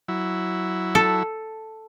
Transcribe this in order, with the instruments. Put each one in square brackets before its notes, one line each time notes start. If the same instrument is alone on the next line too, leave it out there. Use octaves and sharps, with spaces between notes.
[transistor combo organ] F#3 E4
[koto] A4